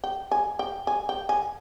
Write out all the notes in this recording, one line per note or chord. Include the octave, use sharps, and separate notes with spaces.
G5
G#5
G5
G#5
G5
G#5